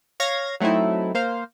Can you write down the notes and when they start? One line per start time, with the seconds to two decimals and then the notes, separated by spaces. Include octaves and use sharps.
0.20 C#5 F5 G#6 A#6
0.60 F#3 A3 C4 D#4 E4
1.14 A#3 C5 F5